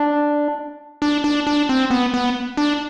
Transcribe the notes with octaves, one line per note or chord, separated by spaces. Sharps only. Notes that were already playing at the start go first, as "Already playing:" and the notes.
Already playing: D4
D4
D4
D4
C4
B3
B3
D4